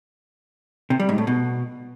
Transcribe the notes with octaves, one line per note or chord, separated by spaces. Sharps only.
C3
G3
G#2
A2
B2